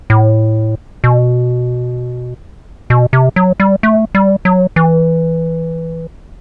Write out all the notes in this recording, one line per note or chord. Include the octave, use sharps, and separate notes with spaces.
A2
B2
B2
C3
F#3
G3
A3
G3
F#3
E3